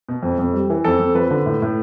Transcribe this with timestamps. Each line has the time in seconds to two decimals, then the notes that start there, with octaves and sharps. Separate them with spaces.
0.09 B2
0.23 F2
0.39 F2
0.53 G3
0.70 E3
0.84 F2 A4
0.99 F2
1.15 F3 B4
1.31 D3
1.46 A2
1.62 A2